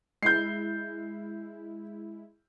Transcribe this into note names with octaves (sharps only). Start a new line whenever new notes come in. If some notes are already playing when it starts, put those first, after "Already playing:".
G#3 E4 G6 C7